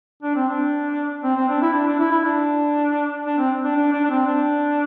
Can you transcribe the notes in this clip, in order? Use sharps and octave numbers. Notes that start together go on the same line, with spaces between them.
D4
C4
D4
C4
C4
D4
E4
D4
D4
E4
E4
D4
D4
C4
D4
D4
D4
D4
C4
D4